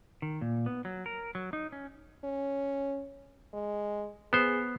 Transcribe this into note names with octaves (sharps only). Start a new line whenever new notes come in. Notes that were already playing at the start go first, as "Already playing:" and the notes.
D#3
A#2
B3
F#3
A#4
F#3
D#4
C#4
C#4
G#3
B3 G#4 C5